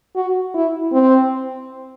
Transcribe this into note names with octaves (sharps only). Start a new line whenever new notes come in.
F#4
E4
C4